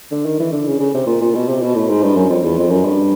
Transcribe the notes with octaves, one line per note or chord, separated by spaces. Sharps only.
D3
D#3
E3
D3
C#3
C#3
C3
A#2
A#2
B2
C3
B2
A2
G#2
G2
F#2
F2
E2
F2
F#2
G2